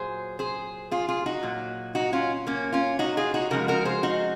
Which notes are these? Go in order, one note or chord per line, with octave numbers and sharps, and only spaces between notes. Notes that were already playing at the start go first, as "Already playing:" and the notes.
Already playing: A#2 F#3 G#4 C5
G#4 C5
F4 G#4
F4 G#4
D#4 F#4
A#2 F#3
D#4 F#4
C#4 F4
A#3 C#4
C#4 F4
D#4 F#4
F4 G#4
D#4 F#4
C#3 F3 G#3 F#4 A#4
F#4 A#4
G#4 C5
D#4 F#4